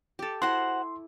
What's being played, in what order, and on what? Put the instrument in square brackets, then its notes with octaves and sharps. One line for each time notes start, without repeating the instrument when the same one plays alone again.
[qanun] G4 A4
[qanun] E4 [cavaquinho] F#4 C5 F#5 [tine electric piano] C6